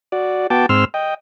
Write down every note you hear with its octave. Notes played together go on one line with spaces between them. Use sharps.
F#4 D5
B3 F#4 G5 A5 D6
G#2 C4 C6 E6 F6
D#5 G5